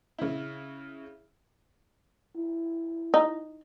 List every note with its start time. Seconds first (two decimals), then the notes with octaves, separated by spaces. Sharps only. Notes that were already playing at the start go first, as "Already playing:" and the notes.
0.19 C#3 E4
2.36 E4
3.14 D#4